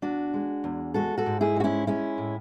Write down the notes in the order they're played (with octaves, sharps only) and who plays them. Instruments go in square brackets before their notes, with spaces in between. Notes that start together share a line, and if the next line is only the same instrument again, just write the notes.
[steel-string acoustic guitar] E2 D4 F#4
G#3
E2
G#3 F#4 A4
F#4 A4
G#2
E4 G#4
G#3 F#4
C#4 E4
G#3 C#4 E4
A2